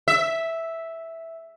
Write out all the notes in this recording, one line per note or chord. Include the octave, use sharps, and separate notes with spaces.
E5